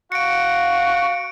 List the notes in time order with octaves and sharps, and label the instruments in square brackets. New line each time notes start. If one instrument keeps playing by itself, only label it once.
[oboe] F#4 [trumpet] F5 [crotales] C#7 D7